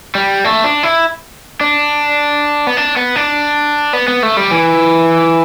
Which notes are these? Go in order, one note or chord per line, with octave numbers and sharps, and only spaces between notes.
G3
A3
D4
E4
D4
B3
D4
B3
D4
B3
B3
A3
G3
E3